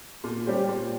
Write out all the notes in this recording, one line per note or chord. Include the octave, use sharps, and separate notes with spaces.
A#2
G3 C#4 G4 C5
A#2